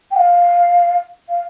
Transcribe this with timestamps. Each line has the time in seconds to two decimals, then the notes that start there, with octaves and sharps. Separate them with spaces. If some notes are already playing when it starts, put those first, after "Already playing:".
0.11 G5
0.16 F5
1.29 F5